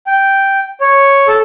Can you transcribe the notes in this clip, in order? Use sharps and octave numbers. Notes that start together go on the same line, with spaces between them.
G5
C#5
A4